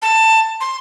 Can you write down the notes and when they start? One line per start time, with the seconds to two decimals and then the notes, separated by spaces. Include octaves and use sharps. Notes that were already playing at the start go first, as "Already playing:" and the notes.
0.02 A5
0.61 C6